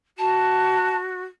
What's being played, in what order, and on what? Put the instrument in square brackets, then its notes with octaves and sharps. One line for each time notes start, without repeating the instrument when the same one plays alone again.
[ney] F#4 [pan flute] A5